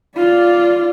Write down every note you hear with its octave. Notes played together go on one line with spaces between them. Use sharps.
F4 D5